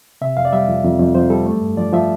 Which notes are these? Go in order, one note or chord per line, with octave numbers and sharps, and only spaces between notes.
C3 E5
F2 F5
D5
G3 E5
F2
F2
F2
F2 C5
G3 A4
A3
G2
F3 D5
F3 E5